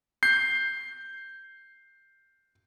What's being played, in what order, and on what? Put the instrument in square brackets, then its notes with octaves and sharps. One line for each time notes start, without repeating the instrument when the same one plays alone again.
[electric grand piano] G6 C7